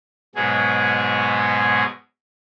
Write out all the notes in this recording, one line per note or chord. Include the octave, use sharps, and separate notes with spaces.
G#2 B2 F#3 G#3 G#4